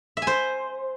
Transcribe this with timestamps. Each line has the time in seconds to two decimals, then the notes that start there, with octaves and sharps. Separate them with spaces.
0.17 E5
0.22 G#5
0.27 C5